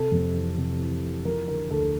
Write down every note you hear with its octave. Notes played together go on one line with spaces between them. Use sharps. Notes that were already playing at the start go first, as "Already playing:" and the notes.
Already playing: C3 A4
F2
E3
C3
E3
E3
F3 A#4
D3 A#4
D2 A4